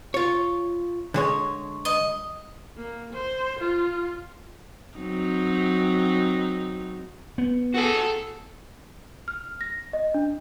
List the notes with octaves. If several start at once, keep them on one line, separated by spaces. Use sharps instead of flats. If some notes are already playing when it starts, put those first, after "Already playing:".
F4 C#5
D3 G#3 C#5
D#5
A#3
C5
F4
F#3 C4 D#4
B3
F#4 G#4 A4
F6
A#6
D#5
D4